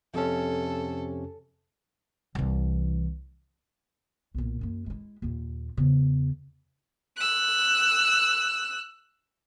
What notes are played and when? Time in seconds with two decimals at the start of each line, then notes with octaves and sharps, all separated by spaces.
0.14 F2 C3 C#4 A4
2.35 C2 E3
4.34 B1 A#2
4.61 F#2 A#3
4.86 G#3 E4
5.22 D#2 A#2
5.77 E2 C#3
7.17 E6 F#6